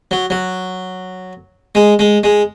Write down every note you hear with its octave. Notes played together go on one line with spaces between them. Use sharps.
F#3
F#3
G#3
G#3
G#3